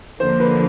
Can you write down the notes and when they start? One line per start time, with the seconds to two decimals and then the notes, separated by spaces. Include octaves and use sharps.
0.19 D3 F3 A#3 C5
0.40 B4